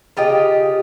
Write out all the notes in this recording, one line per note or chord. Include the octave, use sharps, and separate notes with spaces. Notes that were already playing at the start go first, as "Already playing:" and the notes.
C#3 F4 G4 D#5